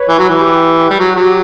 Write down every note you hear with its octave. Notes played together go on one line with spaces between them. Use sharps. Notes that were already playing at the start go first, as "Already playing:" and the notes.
Already playing: B4 C#5
E3
F#3
E3
G4
G3
F#3 F#4
F#3 G4